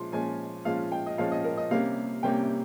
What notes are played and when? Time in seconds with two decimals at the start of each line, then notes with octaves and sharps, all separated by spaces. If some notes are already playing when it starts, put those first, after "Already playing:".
Already playing: A#2 F3 G#3 C#4 C6
0.12 A#2 F3 G#3 C#4 G#5
0.65 A#2 F3 G#3 C#4 F5
0.92 G5
1.06 D#5
1.18 A#2 F3 G#3 C#4 F5
1.32 D#5
1.44 A#4
1.57 D#5
1.71 C3 G3 A#3 C#4 F5
2.23 C3 G3 A#3 C#4 G5